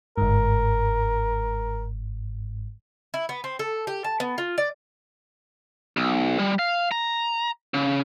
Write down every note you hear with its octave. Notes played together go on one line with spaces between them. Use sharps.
G1 G#2 A#4
E4
B3
C4
A4
G4
A5
B3
F4
D5
B1
G3
F5
A#5
C#3